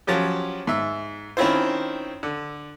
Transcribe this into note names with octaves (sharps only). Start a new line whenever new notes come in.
F3 F#3 C#4 G4
G#2 E5
D#3 C4 C#4 E4 F4 C5
D3